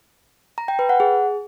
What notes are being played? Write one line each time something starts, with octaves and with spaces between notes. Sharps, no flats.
A#5
G5
B4
F#5
G#4